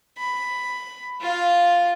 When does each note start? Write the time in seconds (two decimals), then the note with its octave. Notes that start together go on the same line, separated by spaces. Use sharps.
0.18 B5
1.21 F4 F5